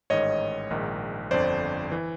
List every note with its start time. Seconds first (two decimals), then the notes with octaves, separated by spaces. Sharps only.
0.10 A1 G#2 D#3 C#5 D#5
0.70 A#1 G#2 D#3
1.31 G1 F2 D3 C5 D5
1.92 E3